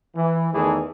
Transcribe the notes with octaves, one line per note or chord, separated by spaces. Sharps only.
E3
E2 D#3 E3 A3 G#4